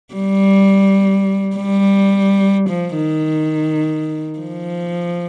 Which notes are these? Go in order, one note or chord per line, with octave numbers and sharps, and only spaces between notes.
G3
G3
F3
D#3
F3